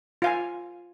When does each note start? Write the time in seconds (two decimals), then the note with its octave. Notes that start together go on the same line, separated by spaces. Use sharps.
0.22 F4 F5 G#5